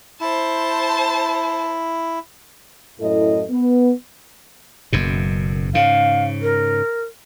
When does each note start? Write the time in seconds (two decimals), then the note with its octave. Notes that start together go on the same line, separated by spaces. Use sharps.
0.21 E4 C5 A5
3.00 F#2 A2 E4 A4 D#5
3.50 B3
4.93 F#1 F#2 B2
5.74 G#2 C#3 F5
6.42 A#4